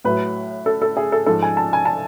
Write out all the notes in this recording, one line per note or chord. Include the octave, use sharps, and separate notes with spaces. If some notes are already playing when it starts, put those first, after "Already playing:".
A2 F#3 B4
A4
A4
G#4
A4
G#2 F3 A4
G#5
A5
G#5
A5